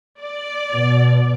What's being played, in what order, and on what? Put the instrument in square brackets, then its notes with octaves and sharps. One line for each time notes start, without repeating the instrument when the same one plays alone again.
[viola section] D5
[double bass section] B2